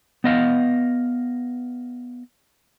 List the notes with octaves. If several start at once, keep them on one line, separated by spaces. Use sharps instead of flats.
B3 D#5 F5